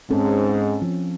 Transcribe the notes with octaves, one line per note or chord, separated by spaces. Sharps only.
G#2 C4 C#4 A4
F3